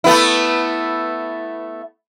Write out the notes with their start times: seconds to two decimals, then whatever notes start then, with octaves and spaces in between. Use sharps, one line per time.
0.04 A3 B3 E4